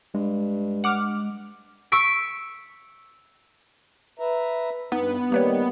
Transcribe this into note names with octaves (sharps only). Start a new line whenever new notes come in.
G2 G#3
F#5 D6 F6
C#6 E6 B6 D7
B4 E5 A#5
G2 B3 D#4
D#3 G3 A#3 B4 C#5